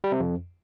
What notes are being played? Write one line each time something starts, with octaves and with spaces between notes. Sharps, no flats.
G3
C3
F2